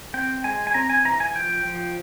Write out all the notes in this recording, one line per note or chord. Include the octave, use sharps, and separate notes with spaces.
C4 G5
G#3 G#5
G#5
C4 A#5
G#5
E3 A#5
G#5
F3 G5
F3